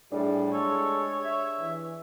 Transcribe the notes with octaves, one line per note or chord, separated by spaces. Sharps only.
A2 G3 D4 G4 G#4
G#3 A4 C#5
E5
E3